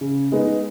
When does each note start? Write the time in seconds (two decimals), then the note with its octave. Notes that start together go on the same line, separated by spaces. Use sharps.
0.01 C#3
0.32 G#3 B3 D#4